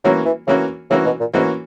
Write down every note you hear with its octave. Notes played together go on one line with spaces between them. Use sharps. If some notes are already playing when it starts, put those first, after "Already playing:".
E3 F#3 A#3 C#4 F#4
E3
C#3 E3 A#3 C#4 F#4
C#3 E3 A#3 C#4 F#4
B2
A#2
G#2 E3 A#3 C#4 F#4